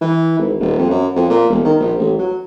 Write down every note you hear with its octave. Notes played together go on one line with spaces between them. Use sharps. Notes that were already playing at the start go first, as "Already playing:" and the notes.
E3
G#1
D#1
F2
F#2
F2
A#2
E1
D#3
A#1
A1
F#3